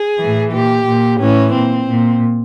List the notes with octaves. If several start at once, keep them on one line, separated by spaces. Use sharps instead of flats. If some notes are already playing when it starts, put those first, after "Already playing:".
Already playing: G#4
A2 E3
A#2 G4
A#2
A2 E3 C#4
A#2 C4
A#2